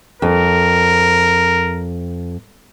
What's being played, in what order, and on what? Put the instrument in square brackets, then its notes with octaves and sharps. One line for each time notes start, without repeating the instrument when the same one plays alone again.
[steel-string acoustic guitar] F2 [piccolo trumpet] A#4